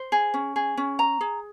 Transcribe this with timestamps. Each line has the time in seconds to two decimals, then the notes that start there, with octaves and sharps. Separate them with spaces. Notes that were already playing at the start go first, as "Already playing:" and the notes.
Already playing: C5
0.12 G#4
0.34 C#4
0.56 G#4
0.78 C#4
0.99 A#5
1.21 G#4